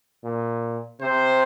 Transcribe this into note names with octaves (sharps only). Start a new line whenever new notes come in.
A#2
C3 C5